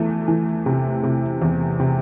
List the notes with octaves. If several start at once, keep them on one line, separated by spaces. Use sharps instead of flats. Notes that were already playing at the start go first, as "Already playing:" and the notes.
Already playing: E2 E3 A3
E3
C3
C3
E2
C3